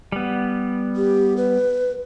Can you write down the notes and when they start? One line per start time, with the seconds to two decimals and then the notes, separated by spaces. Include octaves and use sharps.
0.12 G3 B3
0.96 G4
1.37 B4